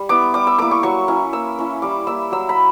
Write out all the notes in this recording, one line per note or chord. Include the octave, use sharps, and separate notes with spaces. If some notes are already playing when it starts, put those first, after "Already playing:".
Already playing: G3
B3 E4 D6
G3 D6
E6
A#3 E4 D6
C#6
F#3 C#6
C#4 E4
A#3 E6
C#4 E4
G3 D6
A#3 E4 E6
F#3 E6
B5